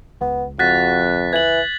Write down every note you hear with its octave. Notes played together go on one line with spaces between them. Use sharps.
C#2 B3
F2 F#4 F#6 A6 B6
E3 G#6 F#7